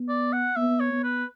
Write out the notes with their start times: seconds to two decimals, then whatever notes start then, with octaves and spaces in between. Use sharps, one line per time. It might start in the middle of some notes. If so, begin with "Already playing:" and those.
Already playing: B3
0.09 D5
0.33 F#5
0.56 B3 E5
0.80 C#5
0.93 B3
1.03 B4